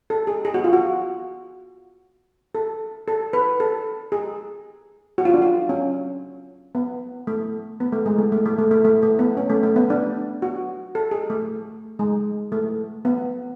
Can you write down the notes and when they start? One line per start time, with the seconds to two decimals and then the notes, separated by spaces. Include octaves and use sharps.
0.10 A4
0.27 G#4
0.45 G#4
0.54 F#4
0.64 F4
0.73 F#4
2.55 A4
3.08 A4
3.33 B4
3.60 A4
4.12 G#4
5.18 F#4
5.25 F4
5.34 D4
5.42 F4
5.69 C#4
6.75 B3
7.27 A3
7.80 B3
7.92 A3
8.06 G#3
8.19 A3
8.32 A3
8.46 A3
8.58 A3
8.71 A3
8.85 A3
9.03 A3
9.19 B3
9.37 C#4
9.50 A3
9.63 A3
9.76 B3
9.90 D4
10.42 F#4
10.95 A4
11.11 G#4
11.30 A3
11.99 G#3
12.52 A3
13.05 B3